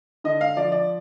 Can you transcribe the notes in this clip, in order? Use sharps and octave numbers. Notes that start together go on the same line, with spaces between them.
D3 D#5
F5
F3 D5
D5